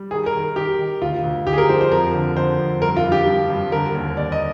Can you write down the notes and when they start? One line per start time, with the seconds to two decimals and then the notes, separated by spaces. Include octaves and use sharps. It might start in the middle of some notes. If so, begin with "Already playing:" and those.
Already playing: G3
0.11 D#3 G#4
0.26 A#4
0.34 D#3
0.56 D#3 G4
0.79 D#3
1.01 D2 F4
1.24 D2
1.46 D2 G4
1.53 G#4
1.58 A#4
1.69 F3 C5
1.81 C5
1.91 F2 A#4
2.14 D3
2.37 D3 C5
2.60 F2
2.82 G2 A#4
2.97 F4
3.04 G2
3.12 G4
3.27 F3
3.50 G2
3.72 D3 A#4
3.95 D#2
4.17 D#2 D5
4.32 D#5